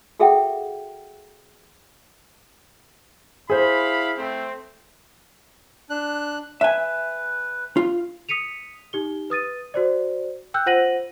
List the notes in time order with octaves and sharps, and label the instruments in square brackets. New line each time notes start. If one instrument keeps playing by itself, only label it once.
[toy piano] F#4 G#4 A4 E5 F#5 G5
[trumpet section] E4 F5 B5 [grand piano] G#4 C5
[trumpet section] A3 C4
[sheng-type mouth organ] D4 F#6
[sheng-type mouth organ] B4 [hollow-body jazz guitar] E5 G#5
[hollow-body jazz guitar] F4
[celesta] D#6 B6 C#7 D#7 F7
D#4 G4 G7
B4 D#6 A6 D#7
F#4 C5 D5
G5 E6 F#6 G6
F4 C5 F#5 A#6 D#7 F#7